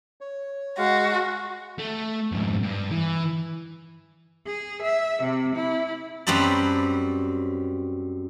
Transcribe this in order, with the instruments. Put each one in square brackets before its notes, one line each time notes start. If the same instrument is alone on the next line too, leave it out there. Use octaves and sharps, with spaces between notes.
[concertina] C#5
[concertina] G#3 F5 [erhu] F#4
[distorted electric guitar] A3
F2 G#2
G2
E3
[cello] G#4
E5
C3
E4
[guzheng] F#2 G3 C4 B4 A5